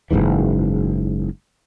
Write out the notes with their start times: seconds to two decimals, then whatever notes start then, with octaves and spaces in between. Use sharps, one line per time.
0.11 F#1 C2 G#2 E3